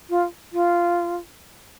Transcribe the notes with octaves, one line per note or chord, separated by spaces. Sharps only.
F4
F4